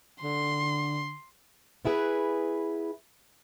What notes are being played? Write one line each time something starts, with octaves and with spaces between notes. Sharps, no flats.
D3 C6
B3 E4 G#4 B4